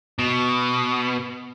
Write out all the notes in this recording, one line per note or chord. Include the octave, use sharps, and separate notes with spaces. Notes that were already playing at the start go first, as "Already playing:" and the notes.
B2